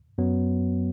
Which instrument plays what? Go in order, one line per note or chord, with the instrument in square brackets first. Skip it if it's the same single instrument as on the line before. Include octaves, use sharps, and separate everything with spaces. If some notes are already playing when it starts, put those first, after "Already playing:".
[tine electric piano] F#2 F#3 B3